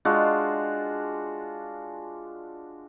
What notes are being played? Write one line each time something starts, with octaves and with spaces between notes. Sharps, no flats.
G#3 D4 F4 F#4